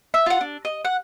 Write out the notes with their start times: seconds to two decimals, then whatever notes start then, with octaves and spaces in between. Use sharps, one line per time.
0.14 E5
0.26 F4 F#5
0.41 D4
0.65 D#5
0.85 F#5